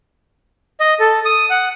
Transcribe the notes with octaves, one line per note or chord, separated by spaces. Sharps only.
D#5
A4
D#6
F#5